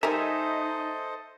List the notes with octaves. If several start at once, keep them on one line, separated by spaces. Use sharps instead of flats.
G3 D#4 A4 A#4 C5 D#5 E5 G#5